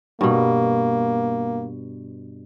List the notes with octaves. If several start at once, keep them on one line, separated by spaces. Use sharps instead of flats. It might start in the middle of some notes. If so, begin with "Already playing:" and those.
G2 B2 A#3